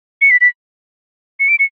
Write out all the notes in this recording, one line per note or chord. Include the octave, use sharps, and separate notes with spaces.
C#7
B6
B6
C#7
D7
C#7